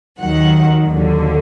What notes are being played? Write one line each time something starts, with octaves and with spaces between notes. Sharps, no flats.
D#2 D#3 F#3 F#5
D#2 D3 F#3